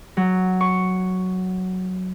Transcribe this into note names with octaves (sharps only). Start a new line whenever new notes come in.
F#3
C#6